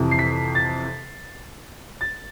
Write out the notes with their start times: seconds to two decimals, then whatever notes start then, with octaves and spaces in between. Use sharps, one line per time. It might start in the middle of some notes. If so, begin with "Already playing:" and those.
Already playing: F2 C3 E3
0.11 C7
0.19 B6
0.55 A6
2.01 A6